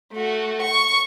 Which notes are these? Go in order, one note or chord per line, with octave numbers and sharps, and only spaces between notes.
A3 F#4
C#6